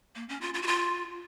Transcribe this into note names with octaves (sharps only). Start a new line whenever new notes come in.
A#3
C#4
F4
F4
F#4
F4